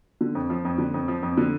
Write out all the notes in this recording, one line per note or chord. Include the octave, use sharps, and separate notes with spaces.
D3
F2
F3
F2
D3
F2
F3
F2
D3